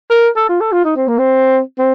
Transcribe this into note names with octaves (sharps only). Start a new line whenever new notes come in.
A#4
A4
F4
A4
F4
D#4
C4
A#3
C4
C4